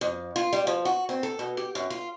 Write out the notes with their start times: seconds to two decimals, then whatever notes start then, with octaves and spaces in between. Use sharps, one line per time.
0.01 F2
0.36 F4
0.53 G3
0.67 F3
0.85 F#4
1.09 C4
1.23 A4
1.39 B2
1.57 G4
1.75 F#2
1.90 F4